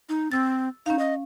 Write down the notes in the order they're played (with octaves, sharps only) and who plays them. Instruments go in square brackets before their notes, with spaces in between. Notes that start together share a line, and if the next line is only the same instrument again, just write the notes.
[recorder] D#4
[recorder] C4 [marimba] E6 A6
[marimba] C#4 F5 [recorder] D#4
[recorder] D#5